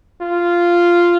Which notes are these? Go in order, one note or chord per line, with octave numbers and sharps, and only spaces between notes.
F4